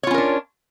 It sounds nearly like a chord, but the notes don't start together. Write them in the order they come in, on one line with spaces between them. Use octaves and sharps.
C#5 F4 C#4 A#4 D4